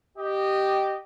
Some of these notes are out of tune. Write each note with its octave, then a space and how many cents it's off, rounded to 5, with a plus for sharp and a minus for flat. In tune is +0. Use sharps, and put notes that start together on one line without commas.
G4 -10 D#5 -15